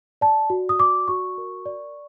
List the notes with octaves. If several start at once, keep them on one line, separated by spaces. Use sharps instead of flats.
D5 A5
F#4
D#6
D5 D6
F#4 C#6
A#4
D5